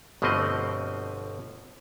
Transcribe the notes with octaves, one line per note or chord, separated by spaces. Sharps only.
G1 B2 F3 A3 C4 D#5